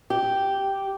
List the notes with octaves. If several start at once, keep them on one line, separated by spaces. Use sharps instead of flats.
G4